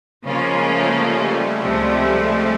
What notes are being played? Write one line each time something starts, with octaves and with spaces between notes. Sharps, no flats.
C#3 F3 G#3 A#3 C#4 F4
A3
G3
C#2 C3 F3 A3